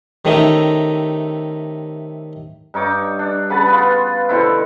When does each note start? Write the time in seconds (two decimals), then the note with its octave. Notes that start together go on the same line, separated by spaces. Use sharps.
0.25 C3 D#3 A3 C#4 D#4 E4
2.74 G2 D#4 C#5 D6
3.19 D4
3.50 C#3 B4 F#5 A5
3.68 B3 F4
4.29 B2 D3 C4 E4